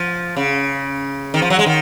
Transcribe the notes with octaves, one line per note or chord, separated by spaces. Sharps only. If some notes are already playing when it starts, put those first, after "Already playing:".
Already playing: F3
C#3
D#3
F3
F#3
G#3
D#3